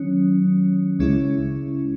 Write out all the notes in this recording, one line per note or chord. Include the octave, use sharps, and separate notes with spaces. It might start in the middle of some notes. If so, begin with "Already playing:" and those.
Already playing: D#3 F#3 C#4
C#2 C#3 G#3 C#4 E4